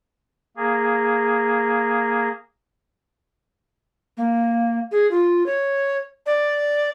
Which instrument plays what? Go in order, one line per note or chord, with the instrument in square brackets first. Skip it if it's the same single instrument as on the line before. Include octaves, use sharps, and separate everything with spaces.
[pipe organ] A#3 G#4
[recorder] A#3
G#4
F4
C#5
D5